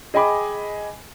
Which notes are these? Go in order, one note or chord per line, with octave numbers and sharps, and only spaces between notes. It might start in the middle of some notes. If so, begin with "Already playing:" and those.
G#4 D#5 G5 G#5 B5 D6